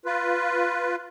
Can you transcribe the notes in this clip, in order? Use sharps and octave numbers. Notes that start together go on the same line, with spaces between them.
F4 B4